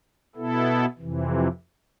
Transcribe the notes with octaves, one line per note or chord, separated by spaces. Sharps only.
B2 B3 E4 A4
F2 C3 E3